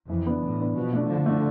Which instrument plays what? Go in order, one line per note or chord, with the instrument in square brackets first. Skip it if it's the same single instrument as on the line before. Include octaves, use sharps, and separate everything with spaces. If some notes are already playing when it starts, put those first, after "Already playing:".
[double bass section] F2 [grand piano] E3
[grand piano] B3 D4
[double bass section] A2 [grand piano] E3
[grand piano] B3 D4
[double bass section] B2 [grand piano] F3
[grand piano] A3 D4
[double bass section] D3 [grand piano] F3
[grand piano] A3 D4